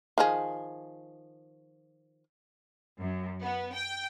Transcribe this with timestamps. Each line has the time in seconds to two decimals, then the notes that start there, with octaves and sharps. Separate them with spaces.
0.18 D#3 F3 G#4
2.98 F#2
3.45 B3
3.76 G5